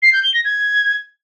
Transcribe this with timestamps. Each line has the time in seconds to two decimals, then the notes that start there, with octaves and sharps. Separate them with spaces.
0.03 C7
0.13 G6
0.24 G7
0.34 A#6
0.45 G#6